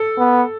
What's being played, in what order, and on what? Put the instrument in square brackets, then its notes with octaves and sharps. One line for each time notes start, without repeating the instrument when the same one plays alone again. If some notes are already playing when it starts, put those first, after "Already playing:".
Already playing: [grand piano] A4
[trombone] B3